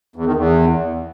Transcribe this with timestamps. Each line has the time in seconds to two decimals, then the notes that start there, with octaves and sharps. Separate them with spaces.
0.16 E2
0.26 D#3
0.36 E2